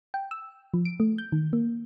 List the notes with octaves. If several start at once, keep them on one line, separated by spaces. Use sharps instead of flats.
G5
E6
F3
D7
A3
G6
D#3
A#3